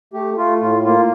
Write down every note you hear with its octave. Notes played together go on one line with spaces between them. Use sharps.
A3 G4
A3 F4
A2 F4
A#3 F4